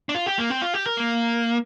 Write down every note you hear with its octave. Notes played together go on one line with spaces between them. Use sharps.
D4
F4
G4
A#3
C4
F4
G4
A#4
A#3